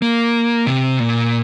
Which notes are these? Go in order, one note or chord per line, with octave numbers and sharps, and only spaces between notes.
A#3
C3
A#2